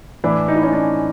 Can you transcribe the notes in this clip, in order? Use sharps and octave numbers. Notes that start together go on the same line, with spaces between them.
A2 E3 D4 E4
D#4
E4
C#4 D#4
D4